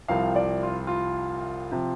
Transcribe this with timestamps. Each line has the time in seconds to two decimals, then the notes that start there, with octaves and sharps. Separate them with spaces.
0.08 C2 C3 F3 F5
0.36 D5
0.63 F4
0.87 F4
1.72 C3 F3